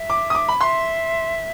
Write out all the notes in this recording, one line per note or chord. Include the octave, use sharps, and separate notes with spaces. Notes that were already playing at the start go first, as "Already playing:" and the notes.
Already playing: E5
D6
D#6
D6
B5
E5 C6